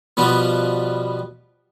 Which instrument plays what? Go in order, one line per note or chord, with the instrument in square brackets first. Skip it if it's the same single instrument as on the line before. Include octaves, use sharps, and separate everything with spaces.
[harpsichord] B2 F3 G3 B3